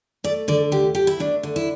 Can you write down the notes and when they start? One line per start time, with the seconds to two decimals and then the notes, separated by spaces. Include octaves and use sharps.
0.24 A3 D5
0.48 D3 D5
0.72 D2 G4
0.95 D2 G4
1.07 E4
1.20 A3 D4
1.43 D3
1.56 E4